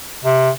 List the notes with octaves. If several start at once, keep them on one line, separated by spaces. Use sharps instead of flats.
C3